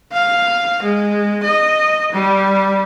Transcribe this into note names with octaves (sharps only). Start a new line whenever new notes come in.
F5
G#3
D#5
G3